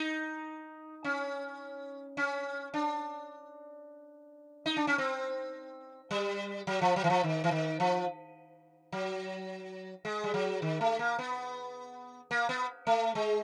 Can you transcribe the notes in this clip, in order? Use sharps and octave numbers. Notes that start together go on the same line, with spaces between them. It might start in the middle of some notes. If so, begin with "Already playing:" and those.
Already playing: D#4
C#4
C#4
D4
D#4
D4
C#4
C4
G3
F#3
F3
F#3
E3
F3
D#3
E3
D#3
F3
F#3
G#3
G3
F#3
D#3
A3
A#3
B3
A#3
B3
A3
G#3